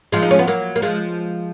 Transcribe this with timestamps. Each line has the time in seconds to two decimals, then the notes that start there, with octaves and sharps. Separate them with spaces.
0.12 F3 G#3
0.22 D#4
0.31 C#4
0.39 B3
0.47 F#3 A#3
0.76 A#3
0.82 F3 G#3